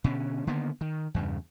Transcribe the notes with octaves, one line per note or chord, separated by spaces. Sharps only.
B2 D3 C#4
D3 D#3 A#3 B3
D#3
E2 G2 C#3